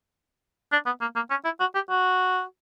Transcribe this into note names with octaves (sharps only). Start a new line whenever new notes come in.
D4
B3
A#3
A#3
C#4
E4
F#4
G4
F#4